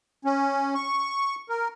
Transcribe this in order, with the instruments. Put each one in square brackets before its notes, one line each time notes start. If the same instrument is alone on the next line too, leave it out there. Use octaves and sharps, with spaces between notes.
[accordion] C#4
C#6
A#4